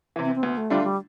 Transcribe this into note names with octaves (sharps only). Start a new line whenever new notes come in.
C3 E3
C4
C4
D2 B3
A3
D3 G3 A3 D4 F4
G3